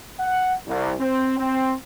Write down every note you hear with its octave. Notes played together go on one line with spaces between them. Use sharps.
F#5
C2
C4
C4